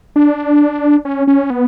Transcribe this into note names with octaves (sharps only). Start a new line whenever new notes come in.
D4
C#4
C#4
B3